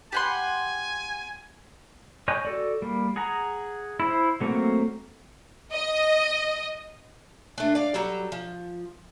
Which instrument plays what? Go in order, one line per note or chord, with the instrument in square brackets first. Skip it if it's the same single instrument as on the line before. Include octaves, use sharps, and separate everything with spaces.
[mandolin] G4 F#5 C6 [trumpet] G#5
[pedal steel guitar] C#5 D#5 G5 G#5 F#6
F#4 A4 D5
G3 A#3
G#4 F#5 A#5
E4 C5
F#3 A3 A#3 C4 F#4
[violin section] D#5
[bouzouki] A3 D4
D5 F5
F#3 G3 A4 A#5
F3